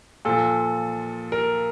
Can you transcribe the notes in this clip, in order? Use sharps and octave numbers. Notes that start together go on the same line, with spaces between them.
A#2 F3 A4
A#4